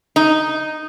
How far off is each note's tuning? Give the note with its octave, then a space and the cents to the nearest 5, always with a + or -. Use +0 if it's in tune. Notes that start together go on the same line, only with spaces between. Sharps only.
D#4 -5